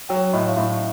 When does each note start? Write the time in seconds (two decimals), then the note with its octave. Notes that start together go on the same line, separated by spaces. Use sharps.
0.09 F#3 G5
0.33 A2 D#5
0.47 F5
0.57 A2 E5